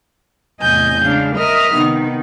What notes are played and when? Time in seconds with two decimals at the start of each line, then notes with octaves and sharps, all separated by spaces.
0.61 E2 A2 C3 D#5 G#5 G6
1.03 C#3 G#3 D4 F5
1.36 A#4 D#5 E5 D#6 F6
1.75 C3 D#3 B3 D#4